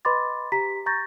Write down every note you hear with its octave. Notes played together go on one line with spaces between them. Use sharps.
B4 D#5 B5 C6 D6 A6
G4 A#5 B6
A#5 C#6 G6 A6 A#6